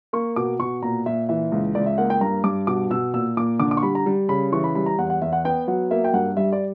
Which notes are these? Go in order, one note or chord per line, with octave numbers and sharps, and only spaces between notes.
A#3 C#6
B2 D6
B2 C#6
A#2 A#5
A#2 E5
E3 E5
C#2
C#2 D5
E5
A#3 F#5
G5
G2 A#5
G2 D6
B2 D6
B2 E6
A#2 E6
A#2 D6
D3 D6
D6
C#6
G3 B5
A#5
G3
C#3 B5
E3 C#6
B5
G3 B5
A#5
E2 F#5
F#5
E2 E5
F#5
B3 G5
F#3 F#5
A#3 E5
G5
G2 F#5
G3 E5
D5